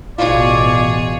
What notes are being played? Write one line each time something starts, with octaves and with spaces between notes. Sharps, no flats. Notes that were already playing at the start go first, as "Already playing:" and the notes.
A1 B2 F4 G#4 C#5 D5